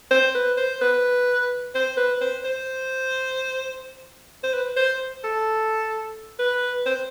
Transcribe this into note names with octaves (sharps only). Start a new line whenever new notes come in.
C5
B4
C5
B4
C5
B4
C5
C5
C5
B4
C5
A4
B4
C5